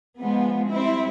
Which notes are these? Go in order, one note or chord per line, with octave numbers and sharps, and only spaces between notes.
F3 G#3 B3
G3 C4 E4